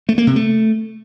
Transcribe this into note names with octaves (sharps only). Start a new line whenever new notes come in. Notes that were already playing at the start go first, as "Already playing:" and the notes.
A3
A#3
C3
A3